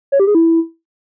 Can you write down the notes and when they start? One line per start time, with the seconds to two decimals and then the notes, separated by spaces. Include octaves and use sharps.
0.12 C#5
0.20 G4
0.27 G#4
0.35 E4